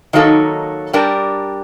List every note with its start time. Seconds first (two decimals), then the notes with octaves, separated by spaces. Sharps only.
0.13 D#3 F#3 A#3 D#4 A4
0.93 G3 D4 G4 A#4